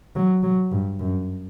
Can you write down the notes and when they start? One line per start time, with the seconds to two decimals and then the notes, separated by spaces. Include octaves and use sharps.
0.16 F#3
0.43 F#3
0.72 G2
0.99 F#2